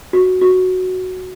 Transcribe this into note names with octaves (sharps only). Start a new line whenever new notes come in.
F#4
F#4